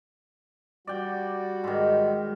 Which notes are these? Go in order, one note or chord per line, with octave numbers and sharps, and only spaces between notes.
G3 F#4 D5 G5
G#2 D#3